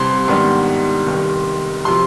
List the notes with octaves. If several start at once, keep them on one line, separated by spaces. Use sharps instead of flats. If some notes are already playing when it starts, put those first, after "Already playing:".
Already playing: C2 C3 G3 C4 C6
G#2 D#3 G3 B3 D4
F1 D#2 D#3 G3
C3 F3 C6